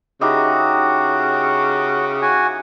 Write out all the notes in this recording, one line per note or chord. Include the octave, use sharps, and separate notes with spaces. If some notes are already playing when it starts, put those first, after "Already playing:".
C#3 D#4 E4 F#4 G4
F#4 G#5